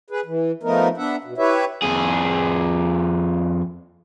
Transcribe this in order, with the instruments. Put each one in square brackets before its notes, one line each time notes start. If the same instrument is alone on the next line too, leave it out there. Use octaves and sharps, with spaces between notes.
[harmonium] G#4 B4
E3
F3 A3 B3 D#4 A#4
B3 D4 E5 F#5
B2
E4 G4 B4 C#5 E5
[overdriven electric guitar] F2 G#4